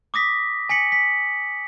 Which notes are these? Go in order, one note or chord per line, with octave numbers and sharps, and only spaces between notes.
D6 D#6 A#6 B6
G#5 B6 C#7 F#7
B6